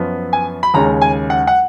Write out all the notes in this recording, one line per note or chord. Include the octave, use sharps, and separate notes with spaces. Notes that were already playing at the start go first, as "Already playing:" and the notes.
Already playing: F#2 F3 B3
G#5
B5
D#2 C#3 G#3 C#4 A#5
G#5
F#5
F#5